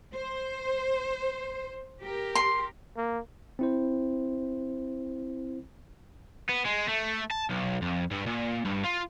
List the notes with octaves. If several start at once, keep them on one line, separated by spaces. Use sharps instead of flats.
C5
G4 A#4
C6
A#3
C4 E4 C5
B3
G#3
A3
A5
B1
F2
G2
A#2
G2
F4